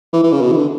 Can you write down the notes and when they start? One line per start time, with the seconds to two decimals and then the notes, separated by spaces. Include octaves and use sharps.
0.13 E3
0.23 E3
0.32 C#3
0.41 B2
0.52 E3
0.56 D3